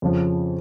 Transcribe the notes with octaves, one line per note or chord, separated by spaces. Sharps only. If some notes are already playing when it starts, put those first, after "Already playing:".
F2 C#3 F3